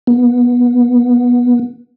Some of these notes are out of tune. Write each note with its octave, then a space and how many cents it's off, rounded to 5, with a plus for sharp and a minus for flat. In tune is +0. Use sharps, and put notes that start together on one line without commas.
B3 -20